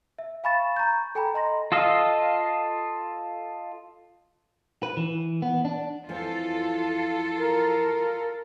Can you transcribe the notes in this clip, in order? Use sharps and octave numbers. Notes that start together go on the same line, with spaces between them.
E5
F5 G#5 B5 C#6 A6 E7
A#5 C#6 G6
A4 G5 G#5 A#5 B5
D#5 A#5 C6 A#6
F4 A4 D#5 F5
B4
E3
B3
D4
F2 E3 F3 F4 A4
A#4